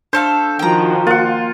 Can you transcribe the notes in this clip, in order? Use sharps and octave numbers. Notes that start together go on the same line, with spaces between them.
A3 D4 A4 C5 F5
D#3 F3 F#4 G5 A#5
A#3 F4 F#5